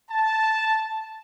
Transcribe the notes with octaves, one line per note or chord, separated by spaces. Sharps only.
A5